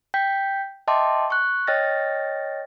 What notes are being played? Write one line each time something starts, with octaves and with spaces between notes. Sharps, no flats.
G5 G6 B6
D#5 E5 G5 A5 C6 D6
C#6 F#6
C#5 D#5 G5 F6 A6 A#6